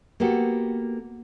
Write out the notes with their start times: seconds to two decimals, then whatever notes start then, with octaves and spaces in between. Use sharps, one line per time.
0.20 A#3 B3 F#4 G4 A4